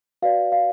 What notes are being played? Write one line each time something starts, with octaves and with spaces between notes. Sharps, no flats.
F#4 B4 D5 F5
F5